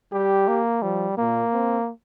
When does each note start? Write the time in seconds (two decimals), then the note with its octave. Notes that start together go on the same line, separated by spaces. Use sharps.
0.13 G3 G4
0.48 A#3
0.82 F3 G3
1.17 A#2 A#3
1.53 C4